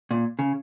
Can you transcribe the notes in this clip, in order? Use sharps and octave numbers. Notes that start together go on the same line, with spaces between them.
A#2
C#3